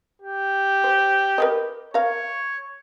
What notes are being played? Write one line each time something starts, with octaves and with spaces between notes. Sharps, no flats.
G4
C5
A#4 B4 D#5
A#4 C#5 F5